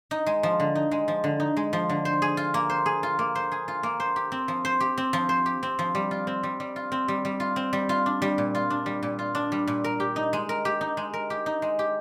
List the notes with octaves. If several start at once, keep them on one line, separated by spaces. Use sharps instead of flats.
D#4
G#3
F3
D3
D#4
G#3
F3
D3
D#4
G#3
F3
D3
C5
G#4
F4
A#3
C5
G#4
F4
A#3
C5
G#4
F4
A#3
C5
G4
C4
F3
C5
G4
C4
F3
C5
G4
C4
F3
G3
F4
C4
G3
G3
F4
C4
G3
G3
F4
C4
G3
F4
D4
G3
A#2
F4
D4
G3
A#2
F4
D4
G3
A#2
A#4
G4
D#4
G#3
A#4
G4
D#4
G#3
A#4
G4
D#4
G#3
G4